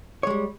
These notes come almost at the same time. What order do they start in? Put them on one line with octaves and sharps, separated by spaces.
C#5 G#3 G3